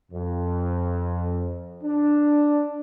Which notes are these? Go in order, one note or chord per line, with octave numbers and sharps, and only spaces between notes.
F2
D4